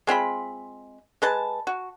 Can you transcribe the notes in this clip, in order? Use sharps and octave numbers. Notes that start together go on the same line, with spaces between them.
G#3 C4 F4 B5
G#3 B4 A5
F#4